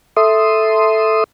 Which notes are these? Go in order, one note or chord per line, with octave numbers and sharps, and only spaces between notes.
A4 E5 C6 D#6